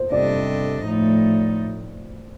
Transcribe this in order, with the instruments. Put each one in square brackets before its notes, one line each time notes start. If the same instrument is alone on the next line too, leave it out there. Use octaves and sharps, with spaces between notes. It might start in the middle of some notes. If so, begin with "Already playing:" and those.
Already playing: [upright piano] C5
[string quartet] C3 G3 D4 A4 D#5 [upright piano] D5
[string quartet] A2 F3 A3 D#4